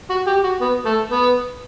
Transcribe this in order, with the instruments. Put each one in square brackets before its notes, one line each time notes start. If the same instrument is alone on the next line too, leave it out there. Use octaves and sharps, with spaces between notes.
[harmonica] F#4
G4
F#4
B3
A3
B3